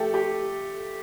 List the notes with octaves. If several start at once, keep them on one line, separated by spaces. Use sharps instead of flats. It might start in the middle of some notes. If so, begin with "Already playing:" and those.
Already playing: A3 G4 A4
G4